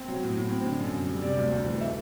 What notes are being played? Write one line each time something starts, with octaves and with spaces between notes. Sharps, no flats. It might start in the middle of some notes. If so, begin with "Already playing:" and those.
Already playing: C4
F#3
A2
A2
C4
D3
F#2
F#2
G3
C3 D5
D2
D2
E3
A3 E5